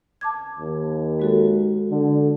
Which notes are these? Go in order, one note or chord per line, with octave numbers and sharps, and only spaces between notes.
A5 D6 G#6
D#2
G#3 F#4 A4
D3